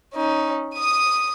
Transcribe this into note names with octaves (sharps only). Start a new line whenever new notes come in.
C#4 D#4
D#6 D#7